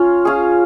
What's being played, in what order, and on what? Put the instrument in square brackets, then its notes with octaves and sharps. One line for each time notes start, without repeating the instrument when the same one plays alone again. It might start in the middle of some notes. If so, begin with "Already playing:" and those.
Already playing: [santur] C#4 F4
C#4 F4 G#4